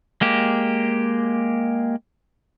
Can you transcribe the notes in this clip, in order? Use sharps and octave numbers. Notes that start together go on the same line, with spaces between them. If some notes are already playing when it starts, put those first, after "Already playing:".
G#3 A#3 G4